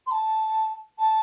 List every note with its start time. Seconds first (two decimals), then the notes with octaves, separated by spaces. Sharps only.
0.07 C6
0.11 A5
0.99 A5